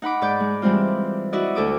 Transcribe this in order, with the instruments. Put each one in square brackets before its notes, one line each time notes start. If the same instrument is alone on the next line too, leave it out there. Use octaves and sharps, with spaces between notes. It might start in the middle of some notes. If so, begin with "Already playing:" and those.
[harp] D#4 F#5 B5 D6
G#2 D5 D6 G6
G#3
E3 G3 G#3 C4 F4
E4 F#4 D5 D#5
D2 A4 D6 D#6